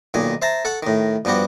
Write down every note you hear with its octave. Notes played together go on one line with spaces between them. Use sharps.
B1 A#2 D#3 G#5
C5 E5 A5 A#5
A4 F#5 C#6
A2 D#3
G2 F3 B3 F#4 G4